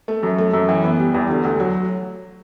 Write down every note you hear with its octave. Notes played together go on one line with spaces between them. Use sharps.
A3
F#2
A3
F#2
E3
B3
G3
E2
D3
D2
F#3